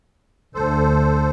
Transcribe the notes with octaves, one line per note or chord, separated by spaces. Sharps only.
D2 A4 C5